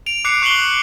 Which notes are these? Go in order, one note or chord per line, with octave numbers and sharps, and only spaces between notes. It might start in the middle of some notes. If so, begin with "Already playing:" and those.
D7 F7
D6 F#6 C7 C#7
C#6 F#6 C7 F#7 G7